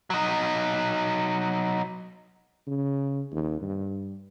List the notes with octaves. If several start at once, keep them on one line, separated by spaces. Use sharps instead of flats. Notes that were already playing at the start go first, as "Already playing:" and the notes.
F#3 D#4
C#3
D#2
G2